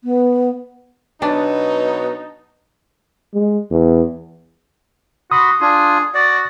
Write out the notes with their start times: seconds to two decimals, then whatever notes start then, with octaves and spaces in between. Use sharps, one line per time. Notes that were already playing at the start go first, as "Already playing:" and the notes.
0.04 B3
1.22 B2 F#3 B3 D4 D#4 B4 A5
3.34 G#3
3.71 E2
5.31 F#4 B5 C6 D#6
5.61 D4 F4 G#4
6.14 F#4 D5